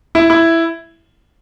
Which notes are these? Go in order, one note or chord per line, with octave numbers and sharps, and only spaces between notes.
E4
E4